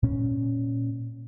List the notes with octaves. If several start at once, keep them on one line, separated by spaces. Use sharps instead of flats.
A#2 C#4